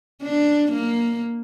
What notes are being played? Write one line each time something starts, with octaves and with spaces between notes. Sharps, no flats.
D4
A#3